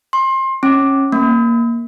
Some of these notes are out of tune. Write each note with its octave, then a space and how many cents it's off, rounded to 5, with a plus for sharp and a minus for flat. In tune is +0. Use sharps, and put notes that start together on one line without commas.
C6 +30
C#4 -25
A#3 +0